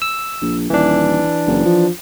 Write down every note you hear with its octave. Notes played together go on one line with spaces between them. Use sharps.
E6
A#1
D#1 E3 D4
F#1
F3